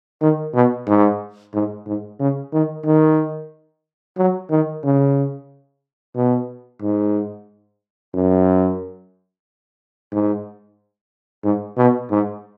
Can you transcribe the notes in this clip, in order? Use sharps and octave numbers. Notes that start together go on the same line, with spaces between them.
D#3
B2
G#2
G#2
G#2
C#3
D#3
D#3
F#3
D#3
C#3
B2
G#2
F#2
G#2
G#2
B2
G#2